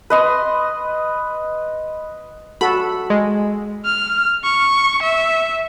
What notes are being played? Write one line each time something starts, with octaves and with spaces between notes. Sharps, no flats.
B4 D#5 C6
F#4 A4 B5
G#3
F6
C#6
E5